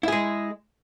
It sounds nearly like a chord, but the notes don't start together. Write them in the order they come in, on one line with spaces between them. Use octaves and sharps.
E4 G#4 G#3